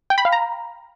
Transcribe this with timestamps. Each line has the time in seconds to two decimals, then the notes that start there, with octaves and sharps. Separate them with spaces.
0.10 G5
0.18 B5
0.25 F5
0.32 A#5